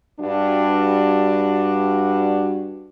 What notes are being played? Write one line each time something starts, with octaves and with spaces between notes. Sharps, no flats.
G2 D4 F#4